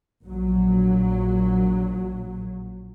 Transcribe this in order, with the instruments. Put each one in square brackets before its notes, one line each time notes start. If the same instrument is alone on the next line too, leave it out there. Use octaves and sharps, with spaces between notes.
[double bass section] A#1 F#3